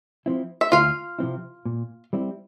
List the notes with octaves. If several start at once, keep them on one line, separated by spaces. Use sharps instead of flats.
F3 C4 E4
E5
D2 F4 F5
C3 F3 C4 E4
A#2
G3 C4 E4